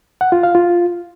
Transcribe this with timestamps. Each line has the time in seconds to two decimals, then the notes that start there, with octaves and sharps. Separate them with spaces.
0.21 F#5
0.32 F4
0.43 F5
0.55 F4